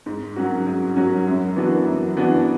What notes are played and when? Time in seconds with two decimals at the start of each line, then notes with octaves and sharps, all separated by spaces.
0.06 G#2
0.36 F#3 C#4 F#4
0.67 G#2
0.96 F#3 C#4 F#4
1.27 F#2
1.56 E3 B3 D4 F#4
1.86 F#2
2.17 E3 B3 D4 F#4